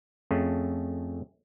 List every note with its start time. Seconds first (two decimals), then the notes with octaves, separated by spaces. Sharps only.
0.31 F2 A3 C#4 G#4